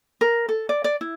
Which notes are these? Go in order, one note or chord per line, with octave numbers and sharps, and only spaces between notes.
A#4
A4
D5
D5
E4